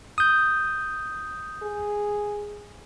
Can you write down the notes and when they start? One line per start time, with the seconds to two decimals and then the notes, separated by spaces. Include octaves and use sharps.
0.18 D#6 G6
1.63 G#4